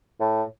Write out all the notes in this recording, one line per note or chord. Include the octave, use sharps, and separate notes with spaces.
A2